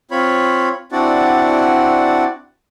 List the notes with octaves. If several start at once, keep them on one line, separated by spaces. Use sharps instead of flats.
C4 F4 C#5 B5
C4 D4 E4 F#4 D5 F#5